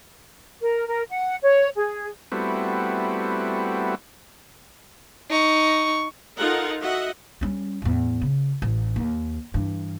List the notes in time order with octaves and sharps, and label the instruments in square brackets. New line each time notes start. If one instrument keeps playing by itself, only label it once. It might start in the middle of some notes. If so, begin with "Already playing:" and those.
[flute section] A#4
A#4
F#5
C#5
G#4
[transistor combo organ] G3 A3 B3 C4 E4 F#4
[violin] D#4 C#6
[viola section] D#4 F4 A4 A#4 F#5
F#4 D#5 E5 F#5
[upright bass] G3 C#4
E2 A2
C#3
A1
D#2
G2 E3